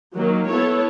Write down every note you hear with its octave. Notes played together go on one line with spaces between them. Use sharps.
D#3 F#3 A#3
B3 E4 A4 C#5